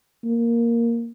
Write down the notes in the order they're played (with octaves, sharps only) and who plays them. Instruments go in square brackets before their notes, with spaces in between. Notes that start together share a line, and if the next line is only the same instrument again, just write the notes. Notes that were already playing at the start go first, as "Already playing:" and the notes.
[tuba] A#3